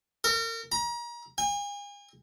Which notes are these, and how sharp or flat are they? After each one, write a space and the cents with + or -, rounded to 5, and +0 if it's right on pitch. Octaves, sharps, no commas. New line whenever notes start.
A#4 -35
A#5 +35
G#5 -40